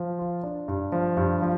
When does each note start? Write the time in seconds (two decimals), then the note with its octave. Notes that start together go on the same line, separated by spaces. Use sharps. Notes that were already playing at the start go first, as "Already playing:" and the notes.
Already playing: F3
0.19 F4
0.43 D4
0.68 G2
0.92 F3
1.17 G2
1.42 F3